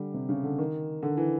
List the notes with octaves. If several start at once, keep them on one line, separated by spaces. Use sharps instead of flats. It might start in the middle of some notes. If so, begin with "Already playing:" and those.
Already playing: D3 G3
C3
C#3
D3
D#3
D3
E3